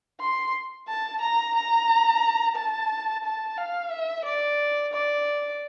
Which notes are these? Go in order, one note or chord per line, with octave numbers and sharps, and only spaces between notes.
C6
A5
A#5
A#5
A5
A5
F5
E5
D5
D5